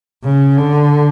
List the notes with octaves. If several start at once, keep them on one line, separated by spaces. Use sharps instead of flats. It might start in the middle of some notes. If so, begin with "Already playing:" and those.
C#3
D3